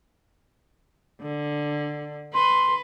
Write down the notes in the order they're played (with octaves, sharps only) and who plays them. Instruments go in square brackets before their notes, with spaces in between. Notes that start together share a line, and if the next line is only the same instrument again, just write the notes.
[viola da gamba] D3
[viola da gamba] B4 [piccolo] C6